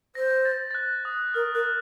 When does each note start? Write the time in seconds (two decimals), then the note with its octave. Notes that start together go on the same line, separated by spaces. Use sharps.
0.15 C5 A#6
0.45 A6
0.71 A6
0.75 F#6
1.05 D#6
1.34 A#4 F6
1.54 A#4 F#6